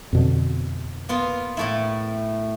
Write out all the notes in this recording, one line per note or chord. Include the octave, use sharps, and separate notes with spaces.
F2 B2 D3
A#3 B3 F4
A2 A3 E4